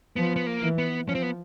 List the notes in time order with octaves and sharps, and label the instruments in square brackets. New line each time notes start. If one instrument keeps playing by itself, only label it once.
[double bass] F3 [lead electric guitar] B3
[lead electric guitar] B3
A#3
[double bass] E3
[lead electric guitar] B3
[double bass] F3 [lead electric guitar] C#4
[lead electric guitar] C4
B3